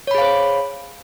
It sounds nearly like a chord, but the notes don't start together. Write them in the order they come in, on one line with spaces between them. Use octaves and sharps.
C#5 B5 G#4 F5 C5